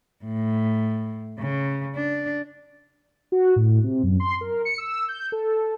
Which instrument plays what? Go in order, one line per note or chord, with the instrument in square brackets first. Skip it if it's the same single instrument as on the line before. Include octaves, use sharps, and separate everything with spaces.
[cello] A2
C#3
D4
[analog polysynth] F#4
A2
C3
F#2
C6
A#4
C#7
E6
G6
A4